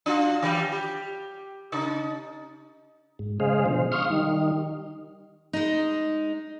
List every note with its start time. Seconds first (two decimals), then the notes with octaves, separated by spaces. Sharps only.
0.06 D4 F4 F#4
0.42 E3 G3 G4
0.72 G4
1.72 C#3 D#4
3.19 G#2
3.40 C#3 G#3 G#4 C5 D#5 F5
3.66 B2 D3 F3 C5
3.92 F5 C6 C#6 D#6 F6
4.10 D#3 G3 D#4
5.53 G#3 D#4